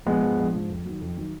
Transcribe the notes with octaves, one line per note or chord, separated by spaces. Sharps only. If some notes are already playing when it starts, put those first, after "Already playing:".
A#1 G#3 B3
G#2 F3
A#1
G#2 F3
F2
D#3 F#3
F2
D#3 F#3